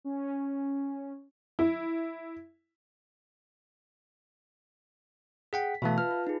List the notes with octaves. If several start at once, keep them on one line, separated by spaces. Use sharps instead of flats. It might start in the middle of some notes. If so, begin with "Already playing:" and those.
C#4
E4
G#4 F#5 G5 B6
B2 E3 A3 E5 F5 A5
F4 B4 F6
F4
D#4 G#4